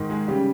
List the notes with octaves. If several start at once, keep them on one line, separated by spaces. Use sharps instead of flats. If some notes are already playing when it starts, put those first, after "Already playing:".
Already playing: G#2 D#3
G#3 G#4
C#3 G3 G4